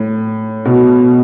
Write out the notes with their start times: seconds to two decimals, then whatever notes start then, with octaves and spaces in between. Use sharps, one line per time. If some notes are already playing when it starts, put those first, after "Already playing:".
Already playing: A2
0.65 B2